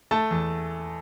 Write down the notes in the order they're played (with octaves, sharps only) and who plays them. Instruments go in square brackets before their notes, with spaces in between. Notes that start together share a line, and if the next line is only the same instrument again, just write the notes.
[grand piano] A3 A5
E2